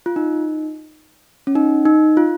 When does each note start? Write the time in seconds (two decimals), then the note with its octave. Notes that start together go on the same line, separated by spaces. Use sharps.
0.06 F4
0.16 D#4
1.47 C#4
1.55 D#4
1.85 D#4
2.17 F4